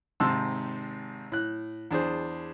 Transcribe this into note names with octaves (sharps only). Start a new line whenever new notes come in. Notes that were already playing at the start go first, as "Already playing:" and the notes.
G#1 G#2 C3 A5 C6 E6
A2 F#6
E2 D4 G#4 C5